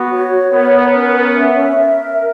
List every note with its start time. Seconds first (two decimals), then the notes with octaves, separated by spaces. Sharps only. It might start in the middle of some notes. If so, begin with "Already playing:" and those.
Already playing: B3 F#4
0.12 C#5
0.53 B3 A#4
0.95 C#4
1.36 E5
1.77 A#4